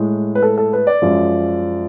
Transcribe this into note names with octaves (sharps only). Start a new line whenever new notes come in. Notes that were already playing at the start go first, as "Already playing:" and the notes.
Already playing: A2 G#3
B4
A4
A4
B4
D5
F#2 F3 G#3